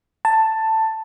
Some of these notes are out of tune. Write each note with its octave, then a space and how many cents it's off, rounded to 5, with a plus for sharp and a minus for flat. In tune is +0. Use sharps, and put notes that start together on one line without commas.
A5 +10